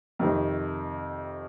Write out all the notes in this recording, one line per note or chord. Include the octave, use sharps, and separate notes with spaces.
F2 C3 D#3